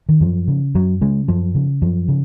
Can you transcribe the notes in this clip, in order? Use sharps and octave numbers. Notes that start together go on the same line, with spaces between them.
D#3
F#2 F3
C#3
F#2 F#3
C#3 G#3
F#2 F3
C#3
F#2 F3
C#3